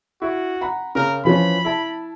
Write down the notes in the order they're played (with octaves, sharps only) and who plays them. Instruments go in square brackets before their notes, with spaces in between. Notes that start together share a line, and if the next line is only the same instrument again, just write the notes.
[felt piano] E4 [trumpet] F#4
[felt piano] F#5 A#5 B5
[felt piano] C#3 [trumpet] A#4
[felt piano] E3 F3 C#4 [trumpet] B5
[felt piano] E4 A5